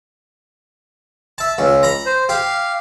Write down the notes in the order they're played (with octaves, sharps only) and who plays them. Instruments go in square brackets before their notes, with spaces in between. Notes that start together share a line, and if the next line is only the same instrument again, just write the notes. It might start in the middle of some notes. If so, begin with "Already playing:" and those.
[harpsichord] E5 A5
C#2 C#3
A#5 B5
[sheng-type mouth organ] C5
[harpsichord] G4 [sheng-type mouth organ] F5